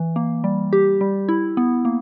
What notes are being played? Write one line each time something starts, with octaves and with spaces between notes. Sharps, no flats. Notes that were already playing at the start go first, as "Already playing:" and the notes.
Already playing: E3
A#3
G3
G4
G3
E4
B3
A#3